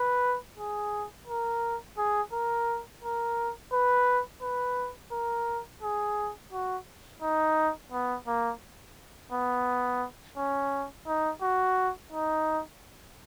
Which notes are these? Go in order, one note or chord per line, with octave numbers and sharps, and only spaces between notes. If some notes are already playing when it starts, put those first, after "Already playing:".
Already playing: B4
G#4
A#4
G#4
A#4
A#4
B4
B4
A#4
G#4
F#4
D#4
B3
A#3
B3
C#4
D#4
F#4
D#4